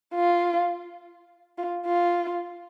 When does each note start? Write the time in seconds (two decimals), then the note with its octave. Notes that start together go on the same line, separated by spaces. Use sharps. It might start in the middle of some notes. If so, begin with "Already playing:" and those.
0.15 F4
1.58 F4
1.86 F4